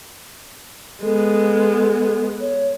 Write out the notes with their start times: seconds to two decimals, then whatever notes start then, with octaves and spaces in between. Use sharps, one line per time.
1.03 G#3 B3 A4
2.41 C#5